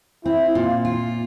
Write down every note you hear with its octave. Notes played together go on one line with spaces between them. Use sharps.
C4 E4
A#2 F4
F4